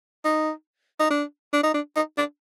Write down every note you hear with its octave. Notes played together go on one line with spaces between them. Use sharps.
D#4
D#4
D4
D4
D#4
D4
D#4
D4